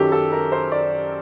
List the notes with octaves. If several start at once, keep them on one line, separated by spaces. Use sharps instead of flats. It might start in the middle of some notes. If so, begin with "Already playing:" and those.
Already playing: F#2 D#3 F#3 G4 A4
A4
A#4
C5
D5